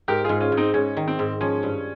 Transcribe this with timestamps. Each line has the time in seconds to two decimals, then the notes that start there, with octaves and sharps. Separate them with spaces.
0.08 G#2 G4 A#4
0.24 G#2 F4 G#4
0.40 C#4 F4
0.52 G#2
0.57 C4 D#4
0.74 G#2 C#4
0.97 D#3
1.08 C4
1.19 G#2
1.41 F3 C#4
1.63 G2